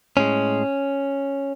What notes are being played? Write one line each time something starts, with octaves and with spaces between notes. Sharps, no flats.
A2 G#3 C#4